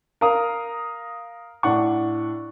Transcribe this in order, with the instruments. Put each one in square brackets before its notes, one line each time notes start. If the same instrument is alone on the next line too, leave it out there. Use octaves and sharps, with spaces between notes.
[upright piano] A#4 F5 A#5 D#6
A2 D4 F#5 C#6